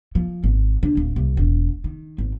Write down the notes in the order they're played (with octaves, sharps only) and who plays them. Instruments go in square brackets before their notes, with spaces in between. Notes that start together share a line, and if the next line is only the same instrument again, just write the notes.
[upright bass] F3
G#1
D3
D1
C2
E1
D#3
G#1